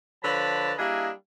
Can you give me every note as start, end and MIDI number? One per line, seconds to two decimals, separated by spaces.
0.23 0.72 50
0.23 0.72 53
0.23 0.72 71
0.23 0.72 73
0.23 0.72 81
0.23 0.72 83
0.77 1.09 55
0.77 1.09 58
0.77 1.09 62
0.77 1.09 64
0.77 1.09 68
0.77 1.09 75